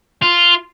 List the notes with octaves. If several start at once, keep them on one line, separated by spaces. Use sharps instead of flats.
F4